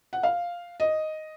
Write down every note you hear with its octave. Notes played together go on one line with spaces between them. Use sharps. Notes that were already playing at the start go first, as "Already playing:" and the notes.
F#5
F5
D#5